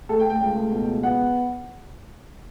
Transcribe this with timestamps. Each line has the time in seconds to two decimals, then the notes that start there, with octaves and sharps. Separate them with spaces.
0.09 A3 A4
0.19 G5
0.24 A3
0.30 G5
0.41 C#2
0.56 A3
0.71 B2
0.87 C#2
1.03 B3 F#5